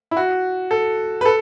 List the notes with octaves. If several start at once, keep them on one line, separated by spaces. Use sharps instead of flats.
E4
F#4
A4
B4
A4